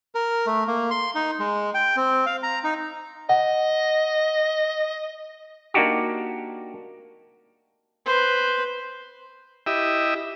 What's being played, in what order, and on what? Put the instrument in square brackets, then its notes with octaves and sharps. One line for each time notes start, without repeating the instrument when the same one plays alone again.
[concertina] A#4
A3
A#3
C6
D#4
G#3
G5
C4
F5
A#5
D#4
[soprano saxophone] D#5 [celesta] F#5
[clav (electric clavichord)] A#3 D4 D#4 F#4 G4
[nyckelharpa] B4 C5
[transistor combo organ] E4 G4 D#5 E5